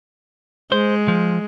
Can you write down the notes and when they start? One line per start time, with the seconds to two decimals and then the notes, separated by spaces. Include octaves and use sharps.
0.72 G#3 C5
1.08 F3